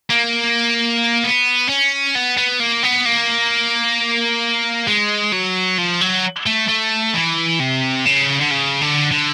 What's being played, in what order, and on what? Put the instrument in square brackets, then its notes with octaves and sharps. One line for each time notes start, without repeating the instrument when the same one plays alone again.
[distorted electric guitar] A#3
B3
C#4
B3
B3
A#3
B3
A#3
G#3
F#3
F3
F#3
A3
A3
E3
C3
C#3
D3
C#3
D3
D3